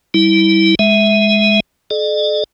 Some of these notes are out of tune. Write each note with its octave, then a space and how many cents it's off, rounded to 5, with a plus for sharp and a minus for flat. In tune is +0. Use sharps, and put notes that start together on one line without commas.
G3 -20 E4 -20
G#3 +0 E5 -5
A4 -45 D5 +45